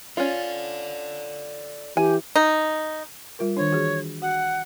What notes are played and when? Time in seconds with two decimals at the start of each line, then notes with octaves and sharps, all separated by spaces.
0.17 C#4 F4 A4 D5
1.97 E3 G4 G#5
2.36 D#4
3.39 G3 F4 A#4
3.57 D#3 D4 C#5
3.71 E3 F#4 G#4
4.22 F#4 F#5